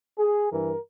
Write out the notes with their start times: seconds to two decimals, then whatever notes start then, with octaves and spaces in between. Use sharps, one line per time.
0.18 G#4
0.50 G2 E3 A#4